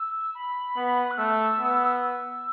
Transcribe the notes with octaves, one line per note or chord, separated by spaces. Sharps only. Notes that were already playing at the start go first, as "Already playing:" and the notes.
Already playing: E6
B5
B3
F#6
A3 E6
B3
E6